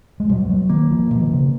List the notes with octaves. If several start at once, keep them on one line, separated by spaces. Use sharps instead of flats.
G#3
B2 F#3
G#3
F#3
D#3 A#3
F3
B2 F3
D#3
C#3